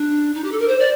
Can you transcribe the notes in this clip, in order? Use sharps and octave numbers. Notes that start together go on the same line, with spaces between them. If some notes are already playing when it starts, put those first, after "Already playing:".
Already playing: D4
D#4
G4
A4
A#4
C5
D5